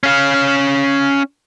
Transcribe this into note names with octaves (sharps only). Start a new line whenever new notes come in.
C#4 F5